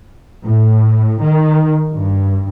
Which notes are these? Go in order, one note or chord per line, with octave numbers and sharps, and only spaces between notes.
A2
D#3
G2